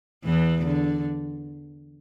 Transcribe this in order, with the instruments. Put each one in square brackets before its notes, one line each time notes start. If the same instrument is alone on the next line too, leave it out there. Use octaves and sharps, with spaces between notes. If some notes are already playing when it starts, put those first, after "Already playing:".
[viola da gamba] E2 E3
D3